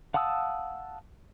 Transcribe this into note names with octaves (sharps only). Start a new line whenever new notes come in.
F5 F#5 A5 D#6 E6